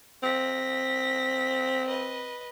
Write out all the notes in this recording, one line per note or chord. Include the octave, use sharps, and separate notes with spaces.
C4 A#6 B6
B4 D#5